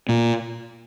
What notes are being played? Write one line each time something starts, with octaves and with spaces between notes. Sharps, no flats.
A#2